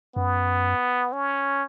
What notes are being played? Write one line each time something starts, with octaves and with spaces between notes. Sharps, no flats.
F#2 B3
C#4